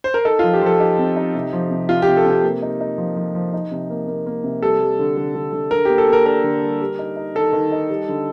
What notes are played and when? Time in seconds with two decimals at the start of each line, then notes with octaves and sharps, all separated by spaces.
0.04 C5
0.14 A#4
0.25 D#4 A4
0.39 F3 F4
0.53 G4
0.62 F3 A4
0.80 D#4 G4
0.98 C4
1.17 D#4
1.34 C3
1.53 F3
1.70 C3
1.89 C3 F4
2.02 G4
2.08 C3
2.17 A4
2.25 C3
2.30 G4
2.43 A#3
2.62 D#4
2.81 D#4
2.98 F3
3.16 F3
3.35 F3
3.53 D#4
3.71 C3
3.90 A#3
4.08 A#3
4.26 A#3
4.44 C3
4.63 G3 A4
4.80 G3
4.99 D3
5.17 D3
5.35 D3
5.53 D3
5.71 D3 A#4
5.85 A#3 G4
5.98 A4
6.08 A#3
6.13 A#4
6.26 D4 A#4
6.44 D3
6.62 G3
6.81 G3
6.99 D#4
7.17 D#4
7.35 D#3 A4
7.53 D#3
7.72 D#4
7.89 G3
8.09 D3